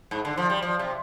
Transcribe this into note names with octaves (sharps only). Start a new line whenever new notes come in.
G#2
D3
F3
G3
F3
C3